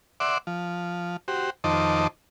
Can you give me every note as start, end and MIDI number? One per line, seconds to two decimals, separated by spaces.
0.20 0.38 74
0.20 0.38 76
0.20 0.38 78
0.20 0.38 84
0.20 0.38 86
0.47 1.17 53
1.28 1.50 66
1.28 1.50 67
1.28 1.50 72
1.64 2.07 41
1.64 2.07 51
1.64 2.07 63
1.64 2.07 72
1.64 2.07 81
1.64 2.07 86